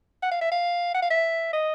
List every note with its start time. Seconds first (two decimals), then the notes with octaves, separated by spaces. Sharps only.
0.23 F#5
0.31 F5
0.41 E5
0.51 F5
0.94 F#5
1.02 F5
1.10 E5
1.53 D#5